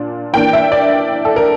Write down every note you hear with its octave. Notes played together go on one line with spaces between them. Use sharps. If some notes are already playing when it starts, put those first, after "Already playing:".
Already playing: A#2 D4
E3 A#3 D4 G5
E5
D5
A4
A#4